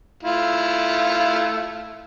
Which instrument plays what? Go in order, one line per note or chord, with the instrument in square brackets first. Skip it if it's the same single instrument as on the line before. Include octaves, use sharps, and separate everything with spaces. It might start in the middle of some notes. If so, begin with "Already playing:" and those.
[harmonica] A3 E4 F4